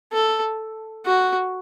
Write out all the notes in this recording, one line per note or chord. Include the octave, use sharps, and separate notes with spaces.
A4
F#4